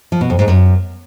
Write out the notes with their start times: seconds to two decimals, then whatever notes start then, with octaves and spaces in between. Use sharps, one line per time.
0.12 F3
0.21 B2
0.30 F2
0.39 G#2
0.48 F#2